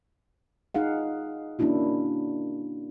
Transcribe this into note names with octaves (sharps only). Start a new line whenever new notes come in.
D#4 G#4 F5 F#5
A#3 C#4 D4 E4 F#4